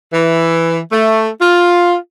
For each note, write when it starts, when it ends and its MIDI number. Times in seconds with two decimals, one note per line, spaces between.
0.13 0.79 52
0.92 1.28 57
1.40 1.95 65